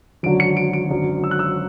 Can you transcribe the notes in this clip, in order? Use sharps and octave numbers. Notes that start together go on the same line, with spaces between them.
G#1 F#2 D3 F#3 D7
C#7
D7
D7
G#1 F#2 D3 F#3
E6
F#6
E6